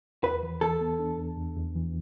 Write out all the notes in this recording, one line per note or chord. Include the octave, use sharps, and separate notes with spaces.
E2 B4
E3
E3 A4
B3
D4
E2
E2
E2
E3